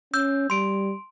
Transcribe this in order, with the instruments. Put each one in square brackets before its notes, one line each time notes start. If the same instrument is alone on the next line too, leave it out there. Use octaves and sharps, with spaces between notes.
[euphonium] C#4 [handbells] E6 G6
[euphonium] G3 [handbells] C6 D7